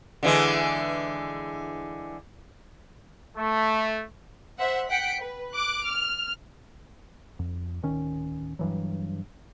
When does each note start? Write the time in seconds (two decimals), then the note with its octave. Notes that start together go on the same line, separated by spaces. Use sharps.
0.23 D3 E3 G#3
3.37 A3
4.58 C5 E5 F#5
4.90 F#5 G5 B6 C#7 D7
5.22 B4
5.54 D6 F#6
5.86 F6
7.39 F2
7.83 D1 D#3 C#4
8.59 G2 E3 F#3